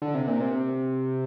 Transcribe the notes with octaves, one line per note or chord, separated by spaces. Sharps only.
D3
C3
A#2
C3